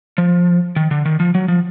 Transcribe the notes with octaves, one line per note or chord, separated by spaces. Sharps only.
F3
D#3
D3
D#3
F3
F#3
F3